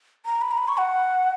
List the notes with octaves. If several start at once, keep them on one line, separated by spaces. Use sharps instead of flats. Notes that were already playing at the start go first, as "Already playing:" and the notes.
A#5
B5
A#5
B5
C#6
F#5